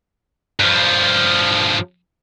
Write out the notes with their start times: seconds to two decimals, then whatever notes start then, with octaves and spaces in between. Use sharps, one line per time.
0.60 G2 F3